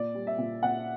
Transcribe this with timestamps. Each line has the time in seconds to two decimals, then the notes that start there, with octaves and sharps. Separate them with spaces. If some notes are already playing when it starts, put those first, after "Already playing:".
Already playing: A#2 D5
0.14 G3
0.27 E5
0.38 A#2
0.63 A#2 F#5